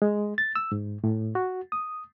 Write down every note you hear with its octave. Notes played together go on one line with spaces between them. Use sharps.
G#3
A6
E6
G#2
A2
F#4
D#6